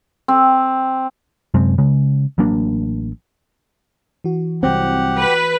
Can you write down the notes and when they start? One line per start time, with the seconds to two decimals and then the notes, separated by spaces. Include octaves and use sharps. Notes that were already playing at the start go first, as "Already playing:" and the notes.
0.28 C4
1.54 F#2 C3 G#3 C4
1.78 C#3 G#3
2.38 A1 F#3 A#3 D4
4.24 E3 F#4
4.63 C2 F#3 C4 G4 F#5
5.19 B4